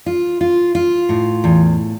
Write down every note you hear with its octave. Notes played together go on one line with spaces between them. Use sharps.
F4
F4
F4
A2
E2